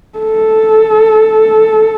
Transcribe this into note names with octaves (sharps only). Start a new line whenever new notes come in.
A4